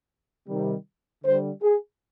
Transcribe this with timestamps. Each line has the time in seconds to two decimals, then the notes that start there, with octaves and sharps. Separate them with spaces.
0.47 C3 D#3 G3
1.24 D3 G3 C5
1.63 G#4